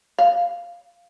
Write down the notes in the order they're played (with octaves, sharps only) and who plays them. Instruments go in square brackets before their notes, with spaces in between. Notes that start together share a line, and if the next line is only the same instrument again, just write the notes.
[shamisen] F5